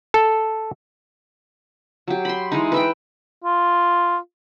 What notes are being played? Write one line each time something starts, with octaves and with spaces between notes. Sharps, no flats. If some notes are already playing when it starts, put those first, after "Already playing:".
A4
F#3 G4
B5 C6
E3 G#3 D#4
B4 E5 G5
F4